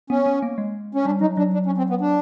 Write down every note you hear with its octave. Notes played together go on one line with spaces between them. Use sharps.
B3 C#4
B3
A#3
G#3
C#4
G3 D4
F#3 D#4
F#3 D4
D4
C#4
C4
B3
D4